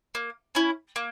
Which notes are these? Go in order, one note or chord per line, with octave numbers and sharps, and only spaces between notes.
A#3
C#4 E4
A#3